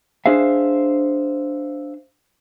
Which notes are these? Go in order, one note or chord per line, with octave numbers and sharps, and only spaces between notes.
D4 G#4 C5 E5 F5